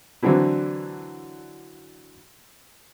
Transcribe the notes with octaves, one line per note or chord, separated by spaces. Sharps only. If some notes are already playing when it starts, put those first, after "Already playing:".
D3 E3 F#3 C4 D4 E4